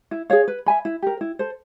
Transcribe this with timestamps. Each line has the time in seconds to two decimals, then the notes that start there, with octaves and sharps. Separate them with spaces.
0.11 E4
0.30 G#4 C#5 F5
0.48 B4
0.66 E5 G#5 B5
0.85 E4
1.02 G4 A#4
1.21 E4
1.39 A4 C5